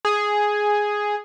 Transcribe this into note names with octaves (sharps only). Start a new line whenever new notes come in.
G#4